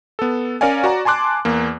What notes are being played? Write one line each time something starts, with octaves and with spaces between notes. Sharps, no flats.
B3 A4
C#4 A#4 C#5 D5 F5 G#5
F#4 D5 A#5
G#5 A5 C6 D6 F#6
E2 A#3